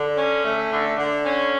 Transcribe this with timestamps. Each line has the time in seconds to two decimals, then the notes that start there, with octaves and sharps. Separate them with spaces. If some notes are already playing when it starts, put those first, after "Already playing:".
Already playing: D3
0.17 C#4
0.45 A3
0.72 D3
0.98 D3
1.25 C#4